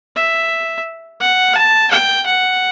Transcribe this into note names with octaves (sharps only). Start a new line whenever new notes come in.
E5
F#5
A5
G5
F#5